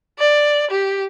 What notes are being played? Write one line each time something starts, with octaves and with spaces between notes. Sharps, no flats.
D5
G4